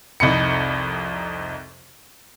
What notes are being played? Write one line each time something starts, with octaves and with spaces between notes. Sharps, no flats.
C2 F2 D#4 B5 C#7